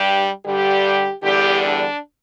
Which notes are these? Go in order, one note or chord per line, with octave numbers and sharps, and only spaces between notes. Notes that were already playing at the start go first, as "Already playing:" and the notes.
Already playing: G2 G3 G4
G2 D3 G3 G4
E2 D3 G3 G4
D4